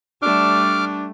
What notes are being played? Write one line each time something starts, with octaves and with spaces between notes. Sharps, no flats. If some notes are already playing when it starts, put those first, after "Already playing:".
G3 A3 D4 D6 F6